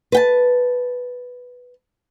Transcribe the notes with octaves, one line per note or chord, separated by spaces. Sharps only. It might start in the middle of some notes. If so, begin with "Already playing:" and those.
B4 G5 A5